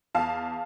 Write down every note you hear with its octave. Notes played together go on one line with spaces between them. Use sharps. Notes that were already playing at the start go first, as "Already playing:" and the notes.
E2 F5 A5